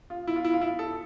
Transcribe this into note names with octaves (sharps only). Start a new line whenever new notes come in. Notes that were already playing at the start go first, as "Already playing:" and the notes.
F4
E4
F4
E4
F4
E4
A4